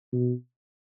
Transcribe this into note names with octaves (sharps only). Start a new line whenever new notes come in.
B2